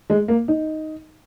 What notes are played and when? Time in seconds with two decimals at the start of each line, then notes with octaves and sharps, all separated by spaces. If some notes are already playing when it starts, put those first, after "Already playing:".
0.10 G#3
0.28 A#3
0.48 D#4